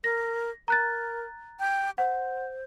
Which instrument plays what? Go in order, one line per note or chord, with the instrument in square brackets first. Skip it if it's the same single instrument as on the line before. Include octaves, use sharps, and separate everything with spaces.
[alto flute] A#4 [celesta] A#6
[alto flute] A#4 [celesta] A#5 F#6 A6
[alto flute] G5
[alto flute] C5 [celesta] F#5